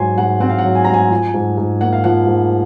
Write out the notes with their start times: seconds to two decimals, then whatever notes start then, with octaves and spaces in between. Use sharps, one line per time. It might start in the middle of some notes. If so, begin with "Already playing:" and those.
Already playing: G#2 F#3 G#5 C6
0.18 G#2 F#5
0.40 C4 F#5
0.49 F5
0.58 F#5
0.64 F#3
0.75 G#5
0.84 G#2 A#5
0.94 G#5
1.11 F3
1.34 G#2
1.58 G#2
1.81 A#3 F#5
1.93 F5
2.04 F3 F#5
2.27 G#2